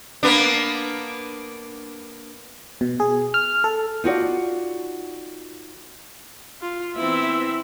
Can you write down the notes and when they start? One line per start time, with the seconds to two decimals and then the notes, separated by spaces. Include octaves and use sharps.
0.23 A#3 B3 D4
2.81 B2
3.00 G#4
3.34 F6
3.64 A4
4.04 D#4 F4 F#4 D5
6.61 F4
6.96 E3 B3 C4 E4 E5